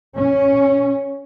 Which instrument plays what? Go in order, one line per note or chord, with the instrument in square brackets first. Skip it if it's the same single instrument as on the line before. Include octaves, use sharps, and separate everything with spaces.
[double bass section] C#4